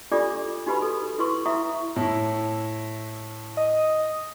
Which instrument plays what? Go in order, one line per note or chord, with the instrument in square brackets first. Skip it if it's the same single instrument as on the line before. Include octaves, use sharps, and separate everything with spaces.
[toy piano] D4 F4 G4 A4 D5 D6
D#4 F#4 G4 B4 B5
A4
E4 B4 C6 C#6
E4 E5 F5 A#5 C#6 D#6
[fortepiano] A2 E4
[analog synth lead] D#5